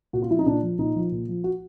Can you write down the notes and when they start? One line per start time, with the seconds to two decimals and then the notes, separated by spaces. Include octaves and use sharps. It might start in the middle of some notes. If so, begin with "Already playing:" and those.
0.13 A#2 F#4
0.22 F4
0.31 F3 E4
0.39 D#4
0.46 A#2 D4
0.63 F3
0.78 A#2 D#4
0.95 F3
1.12 A#2
1.28 F3
1.44 F#4